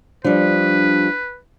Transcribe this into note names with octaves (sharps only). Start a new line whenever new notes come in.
F3 G3 D4 B4